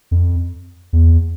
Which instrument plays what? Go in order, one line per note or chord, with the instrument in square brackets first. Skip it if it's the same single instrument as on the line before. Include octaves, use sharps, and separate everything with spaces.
[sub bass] F2
E2